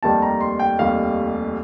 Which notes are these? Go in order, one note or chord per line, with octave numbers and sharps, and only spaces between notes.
F1 D#2 D#3 G3 A5
A#5
C6
G5
F1 D#2 D#3 G3 F5